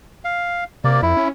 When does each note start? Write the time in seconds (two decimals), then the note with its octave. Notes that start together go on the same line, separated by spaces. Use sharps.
0.25 F5
0.84 C3 A#3 D5
1.03 F2 E4
1.17 C#4